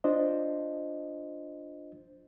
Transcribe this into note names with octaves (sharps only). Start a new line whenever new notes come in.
D4 F4 C5 D#5